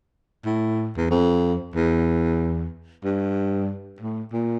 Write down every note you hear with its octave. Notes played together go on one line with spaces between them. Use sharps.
A2
E2
F2
E2
G2
A2
A#2